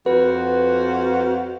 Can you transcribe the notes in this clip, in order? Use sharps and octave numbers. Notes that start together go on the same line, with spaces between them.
F2 F#4 B4